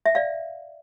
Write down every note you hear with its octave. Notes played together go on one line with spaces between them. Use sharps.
E5
D5 F5